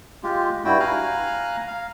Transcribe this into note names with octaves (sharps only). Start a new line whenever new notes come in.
G#3 F4 G4
G2 G3 E4 F#4 G5
F5 G#5 A#5 F#6
F5